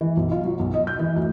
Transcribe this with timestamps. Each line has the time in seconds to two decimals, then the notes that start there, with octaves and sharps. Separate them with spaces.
0.01 E3
0.17 B1
0.31 F4
0.45 F#3
0.59 B1
0.74 D#5
0.87 G6
0.99 E3
1.16 D2